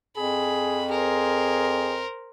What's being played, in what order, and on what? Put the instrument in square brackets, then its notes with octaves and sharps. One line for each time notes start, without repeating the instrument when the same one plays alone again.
[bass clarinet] F2 [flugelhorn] G#4 [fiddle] B5
[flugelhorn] G#4 [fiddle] A#4 C5